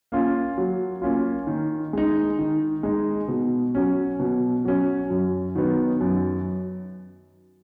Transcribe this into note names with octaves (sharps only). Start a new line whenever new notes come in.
A#3 C#4 F4
F#3
A#3 C#4 F4
D#3
G#3 D#4
D#3
G#3 D#4
B2
F#3 C#4
B2
F#3 C#4
F#2
D#3 F#3 B3 D#4
F#2